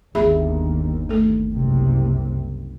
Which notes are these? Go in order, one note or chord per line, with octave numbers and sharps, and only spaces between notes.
G1 D#2 G#4 E5 B5
A3 A4
F#1 C2 C3